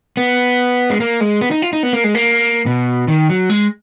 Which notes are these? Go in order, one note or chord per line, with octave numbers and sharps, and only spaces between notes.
B3
G#3
A#3
G#3
B3
D#4
F4
D#4
B3
A#3
G#3
A#3
B2
D#3
F#3
G#3